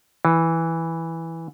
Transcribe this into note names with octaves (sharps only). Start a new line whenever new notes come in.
E3